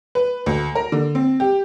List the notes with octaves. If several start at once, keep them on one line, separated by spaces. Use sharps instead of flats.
B4
D2
A#4
D3
C4
G4